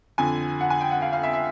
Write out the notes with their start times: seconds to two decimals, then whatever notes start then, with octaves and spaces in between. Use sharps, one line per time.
0.18 F2 D3 G#5
0.61 F#5
0.70 G#5
0.81 G5
0.91 F#5
1.02 F5
1.13 F5
1.23 E5
1.33 E5